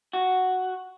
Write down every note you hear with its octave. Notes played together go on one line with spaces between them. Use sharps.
F#4